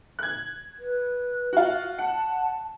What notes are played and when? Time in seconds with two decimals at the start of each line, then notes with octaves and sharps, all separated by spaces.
0.19 F#6 G#6
0.79 B4
1.53 F4 F#4
1.98 F#5 A5